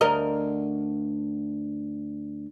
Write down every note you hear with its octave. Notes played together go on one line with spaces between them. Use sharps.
D2 A#4 D#5